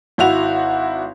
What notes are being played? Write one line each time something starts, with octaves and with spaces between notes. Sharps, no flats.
G#1 E4 F#4 F7